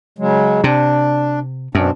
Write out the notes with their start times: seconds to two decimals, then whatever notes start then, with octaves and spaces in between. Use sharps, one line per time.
0.18 C#3 F#3 G#3
0.64 C3 D4
1.75 F#2 B2 C4 D4